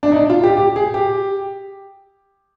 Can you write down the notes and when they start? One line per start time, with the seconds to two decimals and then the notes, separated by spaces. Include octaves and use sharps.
0.03 D4
0.12 D#4
0.16 D4
0.30 F4
0.43 G4
0.57 G4
0.76 G#4
0.94 G4